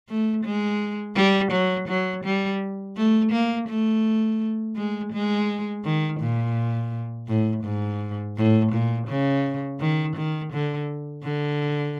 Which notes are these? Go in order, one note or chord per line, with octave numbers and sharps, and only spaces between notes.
A3
G#3
G3
F#3
F#3
G3
A3
A#3
A3
G#3
G#3
D#3
A#2
A2
G#2
A2
A#2
C#3
D#3
D#3
D3
D3